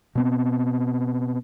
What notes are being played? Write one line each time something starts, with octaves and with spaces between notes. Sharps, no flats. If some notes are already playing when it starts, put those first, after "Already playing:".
B2 B3 C4